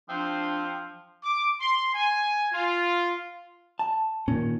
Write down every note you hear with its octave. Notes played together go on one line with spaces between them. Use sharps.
F3 C4 D4
D6
C6
G#5
F4
A5
A#2 D#3 C#4